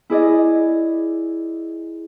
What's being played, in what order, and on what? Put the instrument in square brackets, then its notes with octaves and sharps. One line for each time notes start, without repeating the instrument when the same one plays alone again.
[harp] E4 G#4 D5 D#5